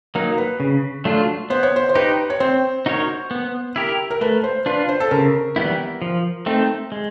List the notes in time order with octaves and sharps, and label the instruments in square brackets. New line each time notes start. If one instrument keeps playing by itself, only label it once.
[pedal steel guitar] F#3 A#3 D#4 [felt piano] A#4
[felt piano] B4
[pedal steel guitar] C#3
F#3 A3 D4 F4
[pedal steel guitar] B3 [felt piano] C5
[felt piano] C#5
C5
C5
[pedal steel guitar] D#4 G4 [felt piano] B4
[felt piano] C#5
[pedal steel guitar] C4 [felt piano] C5
[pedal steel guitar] D#4 F#4 A#4 C#5
B3
E4 G4 A#4
[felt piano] A#4
[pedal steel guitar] A3 [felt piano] B4
[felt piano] C5
[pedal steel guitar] D4 F4 [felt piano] B4
[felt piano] C5
A4
[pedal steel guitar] C#3 [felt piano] A#4
[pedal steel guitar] E3 G3 B3 E4
F3
A3 C4 D#4
G#3